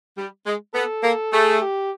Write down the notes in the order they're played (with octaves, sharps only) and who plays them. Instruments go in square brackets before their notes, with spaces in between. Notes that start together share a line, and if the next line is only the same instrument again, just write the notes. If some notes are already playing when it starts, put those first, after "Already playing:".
[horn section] G3
G#3
[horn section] B3 [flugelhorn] A4
[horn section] A#3
[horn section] A3 [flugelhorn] G#4
[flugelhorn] G4